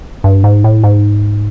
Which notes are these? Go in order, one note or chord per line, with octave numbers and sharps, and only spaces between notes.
G2
G#2
A2
G#2